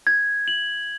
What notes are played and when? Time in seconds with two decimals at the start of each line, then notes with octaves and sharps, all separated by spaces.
0.07 G#6
0.48 F#7